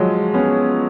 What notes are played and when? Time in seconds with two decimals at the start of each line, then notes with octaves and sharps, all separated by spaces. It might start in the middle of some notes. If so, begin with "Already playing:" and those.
Already playing: F3 F#3 G#3
0.34 B3 C#4